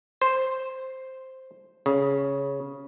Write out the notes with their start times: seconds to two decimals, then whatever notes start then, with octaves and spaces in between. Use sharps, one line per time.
0.22 C5
1.86 C#3